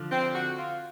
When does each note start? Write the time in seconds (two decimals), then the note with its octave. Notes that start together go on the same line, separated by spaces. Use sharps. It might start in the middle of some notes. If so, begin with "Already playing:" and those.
Already playing: D3 F3
0.12 C4
0.35 F#4
0.59 F4